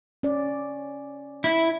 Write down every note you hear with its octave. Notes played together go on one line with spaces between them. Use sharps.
C#4 D5
E4